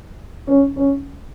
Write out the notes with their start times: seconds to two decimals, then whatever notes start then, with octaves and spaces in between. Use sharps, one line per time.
0.47 C#4
0.76 C#4